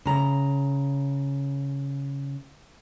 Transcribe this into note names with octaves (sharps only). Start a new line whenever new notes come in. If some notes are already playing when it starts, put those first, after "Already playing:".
C#3 A#5